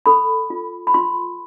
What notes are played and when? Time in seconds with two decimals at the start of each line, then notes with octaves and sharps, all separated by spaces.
0.06 A4 B5
0.50 F4
0.87 B5
0.94 F4 C6